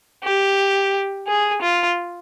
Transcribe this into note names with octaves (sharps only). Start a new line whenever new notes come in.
G4
G#4
F4